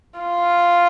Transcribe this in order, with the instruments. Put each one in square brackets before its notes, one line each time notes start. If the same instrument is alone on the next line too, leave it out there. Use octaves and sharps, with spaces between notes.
[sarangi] F4